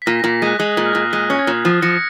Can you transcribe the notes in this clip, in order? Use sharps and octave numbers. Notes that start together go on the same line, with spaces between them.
B6
A#2 A#6
A#2 A#6
G#3 F#6
G#3 D#6
D#6
A#2
F6
A#2 F#6
G#3 F#6
C#4
G#6
A#2
F3
F3 A#6 C#7